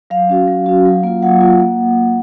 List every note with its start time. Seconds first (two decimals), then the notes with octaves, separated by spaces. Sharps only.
0.10 F#3 F5
0.29 C#4 F#4
0.48 F#3
0.66 C#4 F#4
0.85 F#3
1.03 A#3 F4
1.22 F#3 F#5
1.41 A#3 F4
1.60 A#3